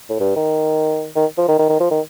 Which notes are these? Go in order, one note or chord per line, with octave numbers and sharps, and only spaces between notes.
A2
G2
D#3
D#3
F3
D#3
D#3
D#3
F3
D#3